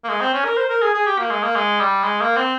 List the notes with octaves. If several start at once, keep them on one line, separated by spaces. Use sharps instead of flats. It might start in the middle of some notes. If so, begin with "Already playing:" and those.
A#3
G#3
C4
C#4
A#4
C5
A#4
G#4
G#4
G4
A#3
G#3
A#3
G#3
G3
G#3
A#3
C4